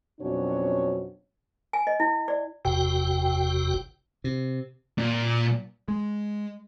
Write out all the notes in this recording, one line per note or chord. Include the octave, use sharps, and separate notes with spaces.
F2 B2 F#3 C#4 D4 C#5
G#5
D#5
E4
D5
F#1 E2 C3 F#4 G5
C3
A#2
G#3